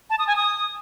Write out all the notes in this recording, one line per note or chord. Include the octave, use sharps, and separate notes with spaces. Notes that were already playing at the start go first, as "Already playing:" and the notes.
A5
D#6
G#5
D#6